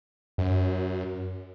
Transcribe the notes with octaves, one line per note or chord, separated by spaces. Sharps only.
F#2